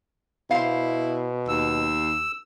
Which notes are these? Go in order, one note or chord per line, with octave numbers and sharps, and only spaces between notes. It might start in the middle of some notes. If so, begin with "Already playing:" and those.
B2 E4 C5 F5
D#2 E6